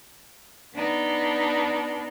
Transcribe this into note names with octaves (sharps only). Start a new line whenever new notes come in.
B3 D4 D#4